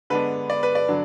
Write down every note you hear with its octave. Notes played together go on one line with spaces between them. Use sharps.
D3 G#3 B3 D4 B4
D5
B4
D5
D3 F#3 D4